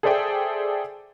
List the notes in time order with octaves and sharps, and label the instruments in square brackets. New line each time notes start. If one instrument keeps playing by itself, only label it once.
[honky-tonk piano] G#4 A4 C5 D5 E5 G5